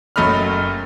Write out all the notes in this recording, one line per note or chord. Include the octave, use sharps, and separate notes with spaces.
F#1 F#3 A3 D#5 B5 F6